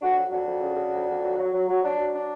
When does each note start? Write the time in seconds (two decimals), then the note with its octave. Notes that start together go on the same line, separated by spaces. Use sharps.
0.01 F2 D4 F#4
0.16 F#3
0.31 F2 D4 F#4
0.46 F2
0.62 C#3
0.77 C#3
0.92 F2
1.07 F2
1.22 F#3
1.37 F#3
1.53 F#3
1.68 F#3
1.83 F#3 D4
1.98 F#3
2.14 D4